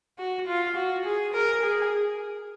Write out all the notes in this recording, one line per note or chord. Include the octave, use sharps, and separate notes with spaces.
F#4
F4
F#4
G#4
A#4
G#4